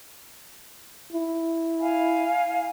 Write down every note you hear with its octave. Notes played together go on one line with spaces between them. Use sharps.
E4
F5 G#5